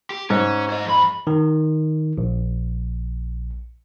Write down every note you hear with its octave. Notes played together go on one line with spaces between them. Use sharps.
G4
G#2 C#4
C5 D#5
F2 B5
D#3
A#1